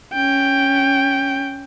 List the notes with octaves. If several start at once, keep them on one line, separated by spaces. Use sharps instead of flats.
C#4 G5